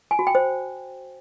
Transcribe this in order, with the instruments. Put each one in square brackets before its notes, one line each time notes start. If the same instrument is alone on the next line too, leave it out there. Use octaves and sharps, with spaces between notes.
[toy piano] G#5
F#4
G5
C5